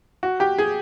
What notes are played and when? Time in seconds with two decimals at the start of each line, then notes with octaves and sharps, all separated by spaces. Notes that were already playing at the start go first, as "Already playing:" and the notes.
0.23 F#4
0.40 G4
0.58 G#4